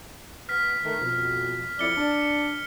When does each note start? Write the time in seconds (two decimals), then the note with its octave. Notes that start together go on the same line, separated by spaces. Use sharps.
0.49 B3 F6 B6
0.83 D#3 A3
1.00 F2 B2
1.79 F2 E4 D5 C#7 G7
1.97 D4